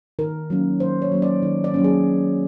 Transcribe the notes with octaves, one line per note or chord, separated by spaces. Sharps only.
D#3 A#4
F#3 A#3 C#4
D#3 C5
C#5
F#3 A#3 C#4
D5
D#3
D5
F#3 A#3 C#4
G#4